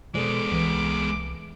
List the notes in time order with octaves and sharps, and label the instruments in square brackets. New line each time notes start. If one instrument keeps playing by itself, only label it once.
[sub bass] B2 [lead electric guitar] G#3 B3 [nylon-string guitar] A4 C5 D5 [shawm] D6
[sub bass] C2 [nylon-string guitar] E3